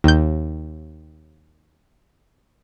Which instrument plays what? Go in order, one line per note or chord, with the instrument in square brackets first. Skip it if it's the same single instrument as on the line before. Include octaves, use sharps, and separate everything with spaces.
[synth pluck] D#2 G6